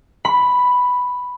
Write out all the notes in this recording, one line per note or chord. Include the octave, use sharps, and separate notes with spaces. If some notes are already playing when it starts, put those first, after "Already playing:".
B5